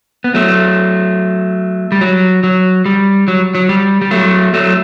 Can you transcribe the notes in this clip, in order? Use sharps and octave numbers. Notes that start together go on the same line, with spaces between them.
B3
F#3 A3
G3
F#3
F#3
G3
F#3
F#3
G3
G3
F#3 A3
F#3 A3